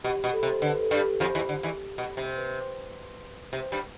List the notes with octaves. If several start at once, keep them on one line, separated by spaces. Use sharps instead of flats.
B2 G4
B2
A4
C3
A4
D3 B4
A4
G2 G3
G4
F2 F3 G4
E2 E3
D3
E2 E3
B2
C3
B4
C3
G2 G3